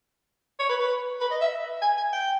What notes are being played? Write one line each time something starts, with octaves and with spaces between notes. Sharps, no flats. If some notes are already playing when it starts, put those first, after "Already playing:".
C#5
B4
B4
B4
D#5
E5
G#5
G#5
G5